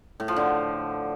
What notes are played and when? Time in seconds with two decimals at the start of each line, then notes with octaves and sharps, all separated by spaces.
0.20 A2
0.28 F3
0.36 D3